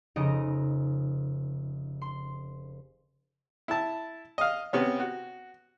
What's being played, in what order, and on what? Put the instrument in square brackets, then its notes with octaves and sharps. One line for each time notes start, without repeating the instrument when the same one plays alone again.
[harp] F1 C#3 D#4 D#5 D7
C6
[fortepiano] E4 A5
D#5 F5
C3 B3 C#4
F#4